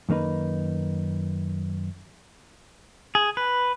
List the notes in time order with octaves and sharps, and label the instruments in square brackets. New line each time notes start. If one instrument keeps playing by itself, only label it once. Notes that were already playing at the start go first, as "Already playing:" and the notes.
[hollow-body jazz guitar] F#2 D#3 A#3 D#4 B4
[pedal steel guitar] G#4
B4